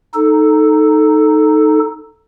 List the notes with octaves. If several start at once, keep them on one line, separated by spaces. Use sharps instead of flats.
D#4 A4